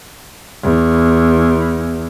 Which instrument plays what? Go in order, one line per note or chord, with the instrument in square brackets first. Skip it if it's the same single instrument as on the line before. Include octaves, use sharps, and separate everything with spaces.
[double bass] E2